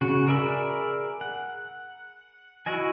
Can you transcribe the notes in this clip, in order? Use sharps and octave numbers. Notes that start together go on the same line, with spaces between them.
C#3 F#4
G#4 A#4 D5 E5 B5
F#5
E4 F#4 D#5 G#5